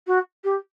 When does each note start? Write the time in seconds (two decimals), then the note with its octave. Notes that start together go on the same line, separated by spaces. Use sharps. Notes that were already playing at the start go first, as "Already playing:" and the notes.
0.07 F#4
0.44 G4